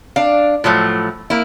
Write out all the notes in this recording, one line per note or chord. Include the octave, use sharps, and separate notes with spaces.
D4 F5
A2 F3 F#3 A3
A#3 E4